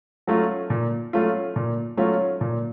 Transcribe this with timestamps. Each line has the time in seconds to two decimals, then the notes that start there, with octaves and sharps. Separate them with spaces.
0.27 F#3 A3 C#4 F4
0.70 A#2
1.13 F#3 A3 C#4 F4
1.56 A#2
1.97 F#3 A3 C#4 F4
2.41 A#2